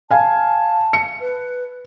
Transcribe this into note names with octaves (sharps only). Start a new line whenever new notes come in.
F5 G#5 A5
C#7
B4